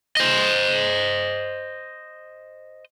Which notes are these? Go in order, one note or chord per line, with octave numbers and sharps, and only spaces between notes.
C5 D#5